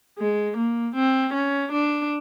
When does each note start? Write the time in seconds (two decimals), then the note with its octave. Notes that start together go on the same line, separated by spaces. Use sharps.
0.18 G#3
0.57 A#3
0.95 C4
1.33 C#4
1.72 D4